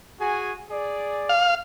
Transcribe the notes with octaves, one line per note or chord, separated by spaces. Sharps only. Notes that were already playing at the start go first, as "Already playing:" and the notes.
F#4 G#4 G#5
G#4 D5
F5